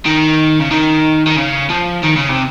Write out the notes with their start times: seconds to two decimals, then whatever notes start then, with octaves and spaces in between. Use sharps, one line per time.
0.06 D#3
0.60 C#3
0.71 D#3
1.27 D#3
1.36 C#3
1.69 F3
2.03 D#3
2.16 C#3
2.29 C3